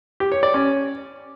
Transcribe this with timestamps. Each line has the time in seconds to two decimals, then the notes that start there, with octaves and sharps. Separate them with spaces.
0.20 G4
0.32 C#5
0.43 D5
0.54 C#4